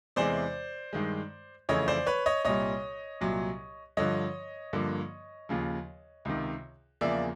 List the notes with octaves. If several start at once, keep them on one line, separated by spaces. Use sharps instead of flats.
E2 C3 E3 G#3 C5 D5
G2 D#3 G#3
F2 C#3 E3 A3 C#5 D#5
C5 D5
B4 C#5
C#5 D#5
C2 A#2 G3 C#5 D#5
C2 A#2 F#3
G2 D3 F3 C#5 D#5
G2 D3 F3 A#3
D#2 C#3 F3
C#2 C3 D#3
E2 C#3 F3 A#3 D5 E5